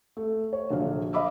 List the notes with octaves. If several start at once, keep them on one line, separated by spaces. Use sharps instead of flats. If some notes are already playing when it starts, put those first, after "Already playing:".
A3
C#5
A#1 D3 F#3 F5
D#5 F5 B5 D6 E6